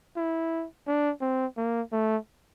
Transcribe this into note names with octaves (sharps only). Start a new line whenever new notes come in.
E4
D4
C4
A#3
A3